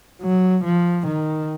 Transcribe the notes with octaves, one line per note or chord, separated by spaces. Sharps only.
F#3
F3
D#3